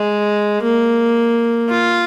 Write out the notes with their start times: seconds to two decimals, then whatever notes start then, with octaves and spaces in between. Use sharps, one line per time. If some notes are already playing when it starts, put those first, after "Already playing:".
Already playing: G#3
0.64 A#3
1.69 F4